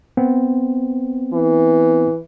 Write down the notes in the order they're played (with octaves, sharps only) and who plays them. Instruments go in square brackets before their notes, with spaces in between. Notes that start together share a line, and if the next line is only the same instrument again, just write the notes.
[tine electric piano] B3 C4
[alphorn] E3